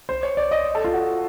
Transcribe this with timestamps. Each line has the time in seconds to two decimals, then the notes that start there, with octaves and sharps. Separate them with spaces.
0.09 C5
0.23 C#5
0.37 D5
0.51 D#5
0.75 A4
0.84 F4
0.94 F#4